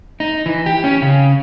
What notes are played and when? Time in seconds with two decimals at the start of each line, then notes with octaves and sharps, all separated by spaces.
0.20 D#4
0.46 E3
0.66 G4
0.84 C#4
1.02 C#3